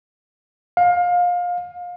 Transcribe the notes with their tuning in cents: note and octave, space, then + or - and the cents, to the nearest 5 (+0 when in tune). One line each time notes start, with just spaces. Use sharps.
F5 +25